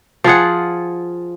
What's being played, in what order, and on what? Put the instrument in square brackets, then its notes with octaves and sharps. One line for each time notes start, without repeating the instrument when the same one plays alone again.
[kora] F3 F4 G#4 F#5